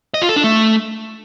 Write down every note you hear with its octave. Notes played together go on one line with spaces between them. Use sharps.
D#5
F4
A4
D4
A3